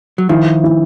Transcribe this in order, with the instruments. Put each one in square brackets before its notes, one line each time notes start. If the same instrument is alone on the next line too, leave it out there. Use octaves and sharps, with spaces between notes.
[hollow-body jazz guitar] F#3
[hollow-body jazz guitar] D#3 F3 [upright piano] E4
[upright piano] E4